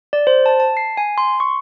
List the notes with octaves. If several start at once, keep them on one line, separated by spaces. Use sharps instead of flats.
D5
C5
A5
A5
C7
G#5
C6
C#6